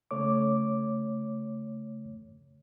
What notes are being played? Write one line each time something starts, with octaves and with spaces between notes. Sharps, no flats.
C#3 A3 C#5 D6